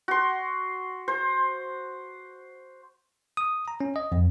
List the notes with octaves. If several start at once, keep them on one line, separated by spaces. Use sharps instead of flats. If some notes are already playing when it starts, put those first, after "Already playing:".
F#4 C6
C5
D#6
A#5
C#4
D#5
F2